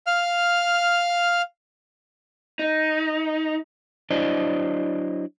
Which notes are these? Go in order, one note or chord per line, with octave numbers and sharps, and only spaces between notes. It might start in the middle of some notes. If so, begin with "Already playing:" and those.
F5 F6
D#4
F#3 D4 E4 C5 D5 D#5